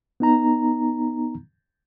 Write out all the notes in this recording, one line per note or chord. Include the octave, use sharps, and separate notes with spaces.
B3 D#4 A#5